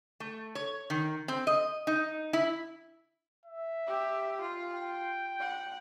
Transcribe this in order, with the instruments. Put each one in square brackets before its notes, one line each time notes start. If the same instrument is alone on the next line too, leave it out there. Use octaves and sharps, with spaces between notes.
[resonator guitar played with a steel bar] A3
C#5
D#3
C4
D#5
D#4
E4
[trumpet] E5
[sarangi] G4
F4
[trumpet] G5
[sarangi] F#5